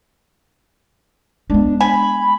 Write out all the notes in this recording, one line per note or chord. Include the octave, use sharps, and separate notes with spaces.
G#3 B3 D4
G#5 B5